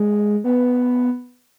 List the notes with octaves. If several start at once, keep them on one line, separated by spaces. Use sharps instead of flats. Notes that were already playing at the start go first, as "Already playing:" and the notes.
Already playing: G#3
B3